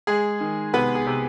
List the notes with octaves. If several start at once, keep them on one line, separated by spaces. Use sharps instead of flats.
G#3 G#4
D#3
C3 B3 B4
G#4
C3